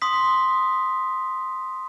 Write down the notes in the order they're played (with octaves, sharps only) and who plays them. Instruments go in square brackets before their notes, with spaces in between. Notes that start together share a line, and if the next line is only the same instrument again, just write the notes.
[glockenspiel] C6 D#6 B6